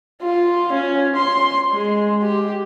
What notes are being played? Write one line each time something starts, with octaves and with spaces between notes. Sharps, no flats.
F4
C#4
C6
G#3
G4